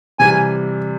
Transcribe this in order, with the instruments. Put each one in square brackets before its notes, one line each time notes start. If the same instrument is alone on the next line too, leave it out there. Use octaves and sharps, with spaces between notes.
[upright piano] C3 E3 G3 [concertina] G#5